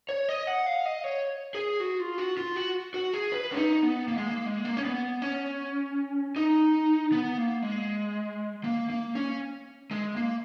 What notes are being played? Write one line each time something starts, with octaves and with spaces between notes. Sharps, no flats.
C#5
D#5
F#5
F5
D#5
C#5
G#4
F#4
F4
F#4
F4
F#4
F#4
G#4
B4
C#4
D#4
B3
A#3
G#3
A#3
G#3
A#3
C#4
B3
C#4
D#4
B3
A#3
G#3
A#3
A#3
C#4
G#3
A#3